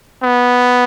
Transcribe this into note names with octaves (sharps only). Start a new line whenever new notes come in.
B3